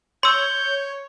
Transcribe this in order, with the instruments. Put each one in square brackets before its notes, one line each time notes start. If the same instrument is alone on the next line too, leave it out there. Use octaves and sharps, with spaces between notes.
[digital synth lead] C#5 [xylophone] C6 E6 [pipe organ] G6